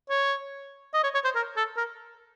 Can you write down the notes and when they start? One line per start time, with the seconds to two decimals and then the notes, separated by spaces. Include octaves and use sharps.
0.10 C#5
0.94 D#5
1.03 C#5
1.14 C#5
1.24 C5
1.35 A#4
1.57 A4
1.76 A#4